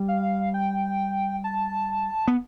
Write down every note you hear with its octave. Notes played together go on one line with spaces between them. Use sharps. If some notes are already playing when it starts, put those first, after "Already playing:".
Already playing: G3
F5
G5
A5
B3